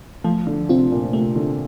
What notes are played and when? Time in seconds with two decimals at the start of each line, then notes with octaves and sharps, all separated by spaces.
0.24 F3 A3
0.47 D3
0.69 C3 C4 F4
0.91 A#2
1.13 C3 A3
1.36 D3